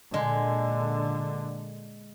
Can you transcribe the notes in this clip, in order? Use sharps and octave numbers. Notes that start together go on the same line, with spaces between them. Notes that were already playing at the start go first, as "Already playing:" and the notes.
A#2 D3 G#3